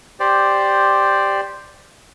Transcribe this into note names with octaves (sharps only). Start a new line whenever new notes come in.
G4 C5 D5